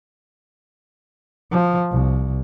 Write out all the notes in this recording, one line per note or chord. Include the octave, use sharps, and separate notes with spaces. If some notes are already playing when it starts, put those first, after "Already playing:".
F3
C2